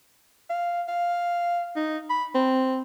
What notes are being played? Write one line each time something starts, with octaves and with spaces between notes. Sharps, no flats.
F5
F5
D#4
B5
C4